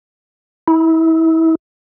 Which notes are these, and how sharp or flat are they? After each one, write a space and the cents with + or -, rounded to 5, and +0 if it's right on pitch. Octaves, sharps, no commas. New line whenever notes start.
E4 -30